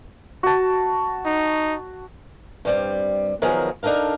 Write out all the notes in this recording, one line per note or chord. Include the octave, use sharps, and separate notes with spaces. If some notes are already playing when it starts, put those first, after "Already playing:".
F#4 A5
D#4
G2 G3 C4
D#3 F3 F#3 B3 G#4 A#4
D4 D#4 A4 A#4 F5